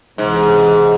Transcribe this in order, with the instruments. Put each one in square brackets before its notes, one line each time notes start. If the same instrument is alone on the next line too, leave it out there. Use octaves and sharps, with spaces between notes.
[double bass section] C#2 C3 E3 [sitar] G#2